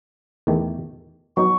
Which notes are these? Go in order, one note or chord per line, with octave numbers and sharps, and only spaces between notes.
E2 D#3 A3
F#3 B3 D#4 C#6